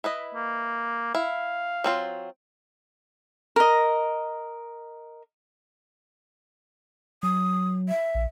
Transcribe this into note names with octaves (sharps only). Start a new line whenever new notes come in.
E4 B4 D#5
A#3
E4 F5
F#3 C4 F4
A#4 D#5
F#3 D#6
E5
A#1